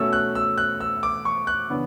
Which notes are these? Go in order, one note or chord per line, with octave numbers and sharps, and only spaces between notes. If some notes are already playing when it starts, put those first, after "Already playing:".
Already playing: B2 A3 C#4 E6
F#6
E6
F#6
E6
D6
C#6
F#6
C#3 E3 B3 D4